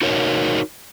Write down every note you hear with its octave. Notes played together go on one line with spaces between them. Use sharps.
D#4 F#4 A#4 C#5